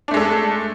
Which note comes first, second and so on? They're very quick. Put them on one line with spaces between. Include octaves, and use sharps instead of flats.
D4 A3 G#3 A4